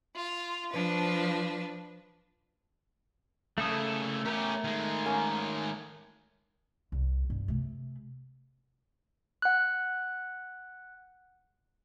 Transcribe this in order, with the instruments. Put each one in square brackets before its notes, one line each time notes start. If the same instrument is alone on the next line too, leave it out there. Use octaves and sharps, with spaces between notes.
[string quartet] F4
F3 D4 B4
[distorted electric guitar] C#3 A#3 [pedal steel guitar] A3 A4 D#6
[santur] B3 A#4 [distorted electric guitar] C#4 G4
[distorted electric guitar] D#3 G#3
[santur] A#3 C#4
[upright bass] C2
G2
C3 A3
[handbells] F#5 F#6